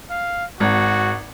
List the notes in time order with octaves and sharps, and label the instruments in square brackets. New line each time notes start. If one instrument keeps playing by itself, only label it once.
[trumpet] F5
[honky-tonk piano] G#1 [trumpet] F#4